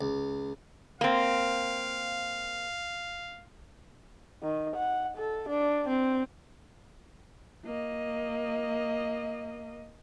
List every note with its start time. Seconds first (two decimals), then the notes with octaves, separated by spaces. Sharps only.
0.01 C#2
1.01 A#3 C4 F5
4.42 D#3
4.76 F#5
5.17 A4
5.49 D4
5.88 C4
7.65 A#3 D#5